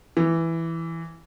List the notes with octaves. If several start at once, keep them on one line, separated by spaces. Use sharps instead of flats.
E3